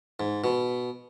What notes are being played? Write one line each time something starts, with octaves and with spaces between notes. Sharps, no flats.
G#2
B2